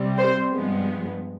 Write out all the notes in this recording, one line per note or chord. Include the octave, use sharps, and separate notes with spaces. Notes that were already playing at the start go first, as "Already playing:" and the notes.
Already playing: C3 G3 C4
C5
G2 F3 G#3 B3